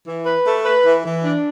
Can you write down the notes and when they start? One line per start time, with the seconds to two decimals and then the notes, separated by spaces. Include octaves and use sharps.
0.06 E3
0.26 B4
0.46 A3
0.65 B4
0.85 E3
1.04 E3
1.24 D4